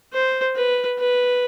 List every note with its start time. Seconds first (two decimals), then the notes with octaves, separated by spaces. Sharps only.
0.13 C5
0.56 B4
0.99 B4